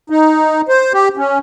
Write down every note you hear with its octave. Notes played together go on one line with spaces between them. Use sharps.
D#4
C5
G4
C#4